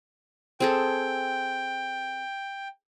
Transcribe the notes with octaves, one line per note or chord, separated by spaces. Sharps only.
C4 G#4 A4 G5